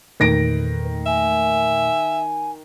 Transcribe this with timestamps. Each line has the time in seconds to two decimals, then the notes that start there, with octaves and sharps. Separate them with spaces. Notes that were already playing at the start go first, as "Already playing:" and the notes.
0.20 E2 A#2 D#3 A3 B4 A#6 D7
1.06 E5 G#5